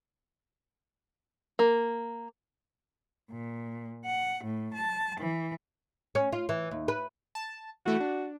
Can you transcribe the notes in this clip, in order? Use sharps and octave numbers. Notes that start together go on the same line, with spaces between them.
A#3
A#2
F#5
A2
A5
E3
C#4
F4
E3
D#2
B4
A5
E3 A3 E4 F#4
D4